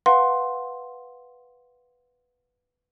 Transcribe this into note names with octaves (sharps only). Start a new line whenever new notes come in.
B4 F5 F#5 C6